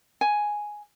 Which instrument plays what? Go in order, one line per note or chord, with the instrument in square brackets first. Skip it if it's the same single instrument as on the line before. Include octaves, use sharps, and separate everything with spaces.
[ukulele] G#5